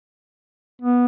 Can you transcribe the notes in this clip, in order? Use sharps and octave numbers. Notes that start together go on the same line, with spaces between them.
B3